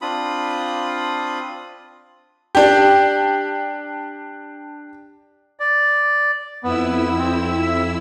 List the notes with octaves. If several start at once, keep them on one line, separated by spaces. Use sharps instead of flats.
C4 D4 F4 B5 D#6
D4 G4
D5
F2 B3 E4 E6
C4
E5